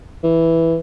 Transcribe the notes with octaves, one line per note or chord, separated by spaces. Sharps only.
E3